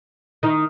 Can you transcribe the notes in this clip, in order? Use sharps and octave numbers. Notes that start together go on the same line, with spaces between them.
D#3 D#4